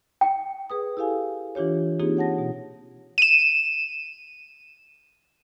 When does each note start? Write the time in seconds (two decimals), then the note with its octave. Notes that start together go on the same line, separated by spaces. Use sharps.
0.21 G5
0.70 G#4 B4 D#6
0.97 E4 G4 A4 F5 G#5
1.55 E3 D4 F4 G4 C#5
2.00 A#3 C4 D#4 F4 G4 G#4
2.17 C#5 F#5 A5 A#6
2.38 B2
3.18 D#7 E7